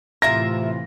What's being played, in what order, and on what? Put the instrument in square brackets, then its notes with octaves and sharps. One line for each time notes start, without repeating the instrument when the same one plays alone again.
[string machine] A2 E3 [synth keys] C3 F4 [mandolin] A#4 E5 A#5 [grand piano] A#6